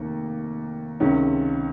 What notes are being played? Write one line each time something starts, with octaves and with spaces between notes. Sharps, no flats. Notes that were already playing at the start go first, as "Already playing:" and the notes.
Already playing: F1 D#2 D#3 A#3
C#2 C3 D#3 G#3 C#4